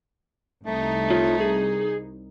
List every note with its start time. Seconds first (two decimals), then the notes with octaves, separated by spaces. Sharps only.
0.66 C2 A3 D#4
1.10 F4 C#5
1.40 G#4